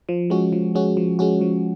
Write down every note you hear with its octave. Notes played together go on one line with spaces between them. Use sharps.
F3
G#3 C#4 F#4
F3
G#3 C#4 F#4
F3
G#3 C#4 F#4
F3